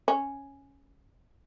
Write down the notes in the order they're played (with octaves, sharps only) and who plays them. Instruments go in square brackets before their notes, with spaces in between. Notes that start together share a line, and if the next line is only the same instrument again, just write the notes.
[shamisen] C#4